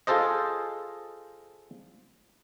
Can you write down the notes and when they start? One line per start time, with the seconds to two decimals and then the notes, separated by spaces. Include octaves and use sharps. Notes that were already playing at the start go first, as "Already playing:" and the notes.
0.07 F4 G#4 A4 C5 D#5